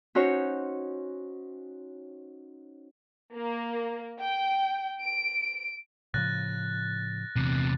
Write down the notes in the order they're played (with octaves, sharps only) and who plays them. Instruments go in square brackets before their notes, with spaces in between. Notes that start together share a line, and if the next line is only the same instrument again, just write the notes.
[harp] C#4 D#4 F#4 C5 C#5
[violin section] A#3
G5
D7
[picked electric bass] A2 C#3 F3 [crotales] F#6 A6 A#6
[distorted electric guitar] E2 C3